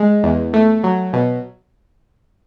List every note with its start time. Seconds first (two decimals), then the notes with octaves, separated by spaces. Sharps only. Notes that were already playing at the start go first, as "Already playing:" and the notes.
Already playing: G#3
0.23 E2
0.54 A3
0.84 F#3
1.13 B2